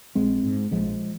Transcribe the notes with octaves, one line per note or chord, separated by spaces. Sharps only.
A#1 G#3 C4
G#2
A#1 F3 G#3